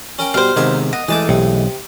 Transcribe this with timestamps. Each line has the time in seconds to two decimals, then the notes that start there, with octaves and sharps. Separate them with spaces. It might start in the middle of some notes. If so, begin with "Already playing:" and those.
0.19 C#4 A#4 G5
0.34 B2 G3 B3 C5 F5
0.56 C3 D#3 G#3 B3 A#4 E5
0.93 D#5 F#5
1.08 E3 G#3 A3 G#4 A5 D6
1.29 B1 C3